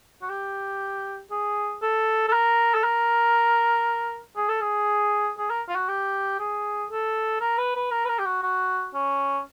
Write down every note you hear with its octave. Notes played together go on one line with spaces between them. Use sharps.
F#4
G4
G#4
A4
A4
A#4
A4
A#4
G#4
A4
G#4
G#4
A#4
F4
F#4
G4
G#4
A4
A#4
B4
B4
A#4
B4
A#4
G4
F#4
F#4
C#4